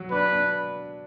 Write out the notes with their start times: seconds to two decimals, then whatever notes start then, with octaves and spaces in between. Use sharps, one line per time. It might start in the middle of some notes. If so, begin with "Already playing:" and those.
Already playing: F#3
0.11 D4 B4
0.32 D4